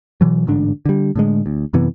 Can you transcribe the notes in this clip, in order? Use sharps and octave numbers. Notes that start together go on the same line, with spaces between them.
B2 E3 F#3
A1 G#2 D3 D4
D3 G3
A2 D3 G#3
D2
F#2 C3 E3 B3